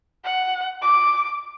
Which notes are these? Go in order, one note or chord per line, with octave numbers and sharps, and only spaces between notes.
F#5
D6